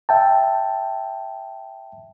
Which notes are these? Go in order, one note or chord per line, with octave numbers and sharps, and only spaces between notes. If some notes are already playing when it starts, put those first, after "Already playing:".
E5 G5 A5